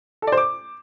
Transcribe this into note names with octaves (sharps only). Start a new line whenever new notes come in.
A4
D5
C5
D6